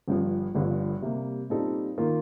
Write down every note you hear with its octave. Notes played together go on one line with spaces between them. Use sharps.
G1 G2 F3
G1 G2 D3 F3
C3 G3 A#3
A#2 G3 C4 D#4 A4
D#3 A#3 F4 A#4